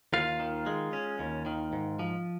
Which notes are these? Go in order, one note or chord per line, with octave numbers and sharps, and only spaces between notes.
D#2 F4 F5
D#3
G#3
C#4
D#2
D#3
G#2
F3